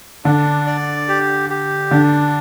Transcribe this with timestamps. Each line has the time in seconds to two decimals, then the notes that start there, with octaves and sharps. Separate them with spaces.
0.25 D3 D4
0.67 D5
1.08 G4
1.50 G4
1.91 D3 D4